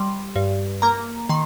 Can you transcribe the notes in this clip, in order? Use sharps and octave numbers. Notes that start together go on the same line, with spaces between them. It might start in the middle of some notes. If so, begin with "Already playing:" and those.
Already playing: G3 C6
G2
A#3 A#5
D#3 C6